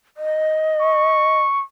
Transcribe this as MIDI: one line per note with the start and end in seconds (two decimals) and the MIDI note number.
0.17 1.39 75
0.81 1.63 85